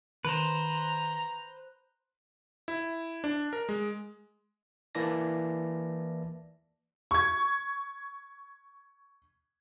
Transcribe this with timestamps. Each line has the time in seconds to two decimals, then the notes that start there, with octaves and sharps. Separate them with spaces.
0.25 D#3 B4 C5 A#5
2.68 E4
3.24 D4
3.53 A#4
3.69 G#3
4.95 E3 A#3 E4 D5 A5 A#6
7.11 C#6 G#6